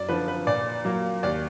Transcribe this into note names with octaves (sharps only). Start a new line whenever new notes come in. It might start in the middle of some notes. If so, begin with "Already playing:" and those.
Already playing: F#2 D5
D3 F3 B4
B4
A#2 D5
F#3 A#3
D#2 D5